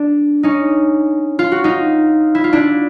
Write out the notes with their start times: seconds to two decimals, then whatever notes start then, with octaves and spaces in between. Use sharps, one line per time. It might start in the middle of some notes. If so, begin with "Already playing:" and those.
Already playing: D4
0.43 C#4 D#4
1.39 F4
1.52 F#4
1.64 D#4 F4
2.35 E4
2.44 F4
2.53 D4 E4